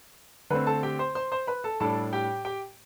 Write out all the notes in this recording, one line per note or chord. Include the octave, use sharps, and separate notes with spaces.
D3 A3 C4 B4 B5
A4 A5
G4 G5
C5 C6
C5 C6
C5 C6
B4 B5
A4 A5
A2 G3 D4 A4 A5
G4 G5
G4 G5